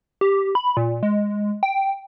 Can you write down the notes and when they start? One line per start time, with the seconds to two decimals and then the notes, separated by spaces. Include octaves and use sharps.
0.21 G4
0.55 B5
0.77 A#2
1.03 G#3
1.63 G5